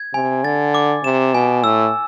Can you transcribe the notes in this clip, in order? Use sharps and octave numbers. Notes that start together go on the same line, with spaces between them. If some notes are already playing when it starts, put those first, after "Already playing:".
Already playing: G#6
C3 G#5
D3 A6
D6
C3 E7
B2 G#5
A2 E6